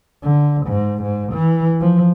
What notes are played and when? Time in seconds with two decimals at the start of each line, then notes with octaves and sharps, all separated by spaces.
0.23 D3
0.67 G#2
1.03 G#2
1.33 E3
1.81 F3